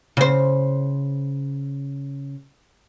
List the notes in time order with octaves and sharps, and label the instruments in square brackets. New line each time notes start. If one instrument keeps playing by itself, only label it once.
[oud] C#3 C5